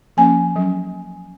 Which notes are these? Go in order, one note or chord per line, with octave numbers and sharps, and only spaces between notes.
F3 A#3 C#4 G#5
F#3 C#4